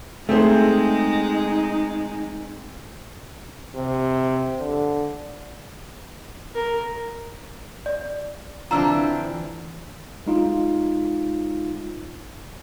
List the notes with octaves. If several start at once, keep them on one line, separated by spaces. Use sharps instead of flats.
G#3 A3 C4 D#4 G#4 C5
C3
D3
A#4
D5
D3 E3 C4 D4 F4 A#5 E6
G#3 D#4 F4